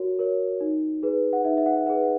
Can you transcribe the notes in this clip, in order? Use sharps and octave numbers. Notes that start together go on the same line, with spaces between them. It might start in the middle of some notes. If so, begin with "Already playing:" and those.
Already playing: F#4 A#4 C#5
A#4 C#5
D#4
G#4 B4
F#5
D#4 E5
E5
F#5
E5
G#4 B4 F#5
F#5